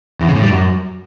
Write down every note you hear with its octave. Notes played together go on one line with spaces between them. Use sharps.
E2
C#3
A2
G3
F#2